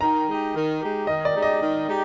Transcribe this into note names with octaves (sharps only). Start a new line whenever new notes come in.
D#3 A#5
G#3 D#4 G4
D#3
G#3 D#4 G4
D#3 D#5
D5
G#3 D#4 G4
D#5
D#3
G#3 D#4 G4